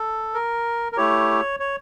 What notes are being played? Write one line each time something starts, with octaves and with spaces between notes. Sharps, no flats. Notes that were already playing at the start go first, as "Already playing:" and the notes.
Already playing: A4
A#4
A#4
A3 E4 G4 C#5
C#5